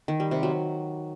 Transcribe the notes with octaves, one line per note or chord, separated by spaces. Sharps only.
D#3
G3
C3
F#3